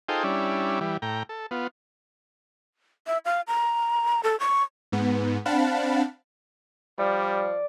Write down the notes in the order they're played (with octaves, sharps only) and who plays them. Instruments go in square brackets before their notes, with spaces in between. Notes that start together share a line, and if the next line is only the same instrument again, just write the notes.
[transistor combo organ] D#4 F4 G#4 A4 C5 G5
G3 C#4 D4 E4
E3 G3
A2 G5 A#5
A4
B3 F4
[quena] E5
F5
A#5
A4
C#6
[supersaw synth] G#2 B3
C4 D4 F5 F#5 A5 B5
[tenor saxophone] F3 [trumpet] G3 [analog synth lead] D5